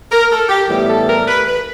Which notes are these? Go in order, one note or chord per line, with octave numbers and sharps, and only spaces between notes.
A#4
A4
G4
A2 E3 G3 B3 E4 G4
A4
A#4
B4
B4